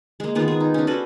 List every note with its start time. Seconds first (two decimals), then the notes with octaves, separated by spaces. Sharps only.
0.20 G#3 A#3
0.35 D#3 G#3 B3 F4
0.48 G#4
0.60 D#4
0.74 C#4 D4
0.87 F#4 A4 B4 C5